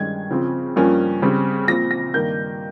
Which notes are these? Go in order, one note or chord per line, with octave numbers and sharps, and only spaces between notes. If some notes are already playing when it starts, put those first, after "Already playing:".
Already playing: G2 D#3 G#3 C#4 G#6
C#3 F3 C4
G2 F3 A#3 C#4
C#3 G3 C4
A#2 F3 C4 A#6
A#6
G2 D#3 A#3 G6